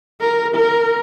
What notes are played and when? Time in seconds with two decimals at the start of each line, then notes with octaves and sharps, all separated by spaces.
0.21 A#4
0.55 A#4